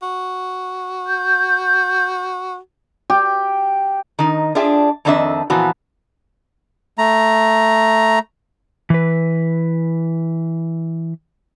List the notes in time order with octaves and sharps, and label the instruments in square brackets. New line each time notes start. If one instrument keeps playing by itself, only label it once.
[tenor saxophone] F#4
[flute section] G6
[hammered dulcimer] G4
[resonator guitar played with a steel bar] D#3 D#4
D4 F4 G#4 E5 G5
F2 D#3 C4 D4 D#5 E5
A#2 E3 F3 B3 F#4
[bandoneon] A3 A#5
[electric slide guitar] E3 B4